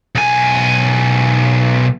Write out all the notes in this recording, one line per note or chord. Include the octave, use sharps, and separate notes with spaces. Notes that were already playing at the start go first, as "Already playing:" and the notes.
B1 G#5